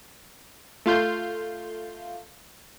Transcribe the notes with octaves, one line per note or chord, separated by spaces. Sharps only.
A3 F4 F5 C6 G6